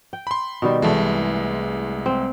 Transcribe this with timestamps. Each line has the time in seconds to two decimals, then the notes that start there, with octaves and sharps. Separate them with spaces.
0.13 G5
0.27 B5 C6
0.62 B2 D#3 G3
0.82 C2 E3 G#3 A3
2.06 C4